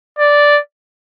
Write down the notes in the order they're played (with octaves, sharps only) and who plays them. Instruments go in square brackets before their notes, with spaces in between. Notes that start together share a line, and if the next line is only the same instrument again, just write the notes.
[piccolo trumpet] D5